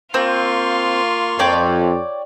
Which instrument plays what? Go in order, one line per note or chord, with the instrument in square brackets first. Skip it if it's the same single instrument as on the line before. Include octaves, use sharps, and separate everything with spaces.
[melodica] A#3 C6 C#6 [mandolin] C4 [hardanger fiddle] F4
[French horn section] F2 [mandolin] C#5 D5 G5